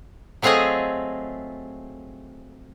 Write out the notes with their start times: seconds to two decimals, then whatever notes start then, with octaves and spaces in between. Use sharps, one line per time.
0.42 F#3 A3 C4 F4 G#4 D#5